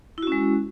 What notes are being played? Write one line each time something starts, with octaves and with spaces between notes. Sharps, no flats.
G#3 C#4 E4 F#4